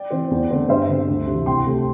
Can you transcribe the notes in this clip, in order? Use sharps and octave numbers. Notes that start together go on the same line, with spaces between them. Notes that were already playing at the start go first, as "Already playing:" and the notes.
Already playing: D5 G5
E3 C4
E2
D3 A3 C4
G2 C5 E5
D3 C4
D2
C3
E3
C2 G5 C6
C3 A3